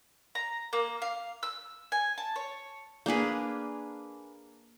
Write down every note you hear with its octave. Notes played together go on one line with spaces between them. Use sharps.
A#5
A#3
F5
E6
G#5
A5
C#5
A#3 D4 G#4 B4